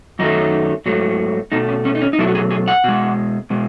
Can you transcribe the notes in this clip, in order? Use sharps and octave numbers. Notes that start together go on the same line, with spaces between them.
F#2 D#3 F#3 A3 D#4
G#2 F#3 A3
B2 A3 D#4
C#4
C#4
D#4
C#4
D#4
B2 F#3 A3 E4
F#4
G#4
G#4
F#5
B2 G#3
B2 G#3